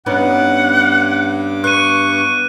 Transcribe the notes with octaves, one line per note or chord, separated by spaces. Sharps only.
G2 B3 C#4 D#4 F#5 D6
B3 C#6 F#6 D#7